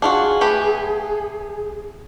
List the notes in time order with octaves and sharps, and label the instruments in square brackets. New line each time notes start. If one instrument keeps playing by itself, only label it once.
[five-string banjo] D4 F4 F#4 [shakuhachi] G#4
[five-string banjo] A3 G4 B4